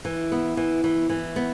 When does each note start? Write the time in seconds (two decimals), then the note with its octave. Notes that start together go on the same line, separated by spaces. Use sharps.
0.05 E3
0.32 B3
0.57 E3
0.84 E3
1.09 E3
1.36 B3